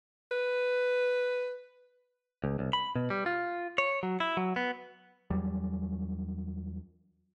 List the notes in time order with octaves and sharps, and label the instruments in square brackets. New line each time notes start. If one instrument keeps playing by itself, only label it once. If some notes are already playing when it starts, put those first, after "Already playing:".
[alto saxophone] B4
[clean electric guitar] C#2
C2
B5
B2
G3
F4
C#5
F#3
E4
F#3
B3
[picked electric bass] E2 F#3 G3